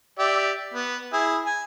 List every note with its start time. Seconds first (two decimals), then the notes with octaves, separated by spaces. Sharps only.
0.19 G4 D5 E5
0.74 B3
1.13 E4 G#4
1.46 G#5